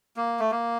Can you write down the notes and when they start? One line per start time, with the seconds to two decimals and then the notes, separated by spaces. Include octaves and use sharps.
0.17 A#3
0.39 A3
0.51 A#3